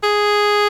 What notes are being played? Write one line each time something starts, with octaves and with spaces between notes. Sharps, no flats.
G#4